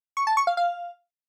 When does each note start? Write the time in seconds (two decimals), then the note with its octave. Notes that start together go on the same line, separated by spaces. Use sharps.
0.17 C#6
0.27 A5
0.37 C#6
0.47 F5
0.57 F5